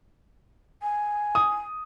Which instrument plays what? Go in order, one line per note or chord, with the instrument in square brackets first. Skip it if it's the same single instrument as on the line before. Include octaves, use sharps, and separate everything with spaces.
[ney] G#5
[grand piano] D#6